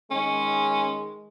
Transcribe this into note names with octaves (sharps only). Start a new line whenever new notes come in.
D#3 G#3 C#4